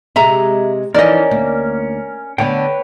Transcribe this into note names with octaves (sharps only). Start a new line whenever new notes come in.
C3 G#3 E5 A#5
E3 F3 C#4 D#4 A#4 D5 D#5
D2 A#3
D3 B3 B4 C#5 G5